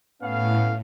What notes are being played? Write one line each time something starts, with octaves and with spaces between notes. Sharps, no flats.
A2 B3 C#4 F5